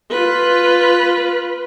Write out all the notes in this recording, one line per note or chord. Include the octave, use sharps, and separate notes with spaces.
F4 B4